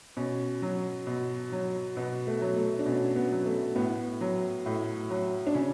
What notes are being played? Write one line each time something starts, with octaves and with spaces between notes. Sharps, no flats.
B2 C#4
F#3
B2
F#3
B2 B3
A3
F#3
A3
D4
B2 C#4
B3
F#3
A3
A2 B3
F#3
A2
F#3
D4
C#3 C#4